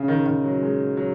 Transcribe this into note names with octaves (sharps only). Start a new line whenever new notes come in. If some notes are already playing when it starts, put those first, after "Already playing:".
Already playing: C#3
D#3
D#3
F#3
G#3
F#3